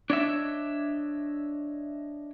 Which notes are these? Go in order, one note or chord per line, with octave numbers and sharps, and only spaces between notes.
D4 C#5 D#5 E5